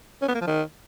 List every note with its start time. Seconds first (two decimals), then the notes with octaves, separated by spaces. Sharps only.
0.22 C#4
0.28 B3
0.34 A#3
0.41 F3
0.47 D#3